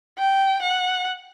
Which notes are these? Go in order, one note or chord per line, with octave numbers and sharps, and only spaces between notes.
G5
F#5